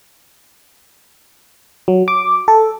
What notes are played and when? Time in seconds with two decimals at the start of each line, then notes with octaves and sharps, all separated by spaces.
1.88 F#3
2.08 D6
2.48 A4